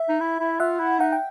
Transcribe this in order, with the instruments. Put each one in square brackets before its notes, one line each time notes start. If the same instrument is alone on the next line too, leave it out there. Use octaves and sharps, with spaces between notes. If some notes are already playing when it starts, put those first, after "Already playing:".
Already playing: [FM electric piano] E5
[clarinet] D#4
E4
E4
[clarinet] F4 [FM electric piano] E5 F#5
[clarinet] E4
[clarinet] D#4 [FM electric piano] F#5
[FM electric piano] G5